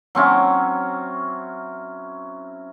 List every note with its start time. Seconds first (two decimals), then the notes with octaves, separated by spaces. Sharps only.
0.15 F#3 C4 C#4 E4